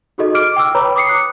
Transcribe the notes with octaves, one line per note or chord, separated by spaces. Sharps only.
D#4 F#4 G#4 A4 D#5
D6 F6 D7
G5 D6 E6
B4 C#5 G5 A#5 B5
D6 D#6 C7 C#7
F#6